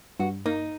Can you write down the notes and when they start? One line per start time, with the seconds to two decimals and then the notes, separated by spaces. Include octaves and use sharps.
0.20 G2 F#4
0.46 A#3 D#4